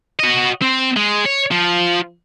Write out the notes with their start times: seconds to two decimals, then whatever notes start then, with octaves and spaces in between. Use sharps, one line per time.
0.19 F#4 D#5
0.62 C4
0.97 G#3
1.26 C#5
1.52 F3